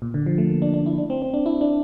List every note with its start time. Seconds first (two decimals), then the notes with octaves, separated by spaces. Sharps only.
0.02 A#2
0.14 D3
0.26 F3
0.38 A3
0.50 A#3
0.62 D4
0.74 D4
0.86 E4
0.98 D4
1.10 C4
1.22 C4
1.34 D4
1.46 E4
1.61 D4